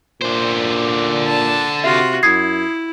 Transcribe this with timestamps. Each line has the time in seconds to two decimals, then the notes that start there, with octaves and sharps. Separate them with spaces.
0.21 A#2 D3 C5
1.27 A5
1.84 C3 F4 F#4 E5
2.23 F#2 E4 D#6 G#6 C7